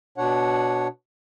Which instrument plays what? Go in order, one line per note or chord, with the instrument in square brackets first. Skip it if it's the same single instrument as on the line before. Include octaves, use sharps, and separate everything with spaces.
[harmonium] B2 D4 C#5 F#5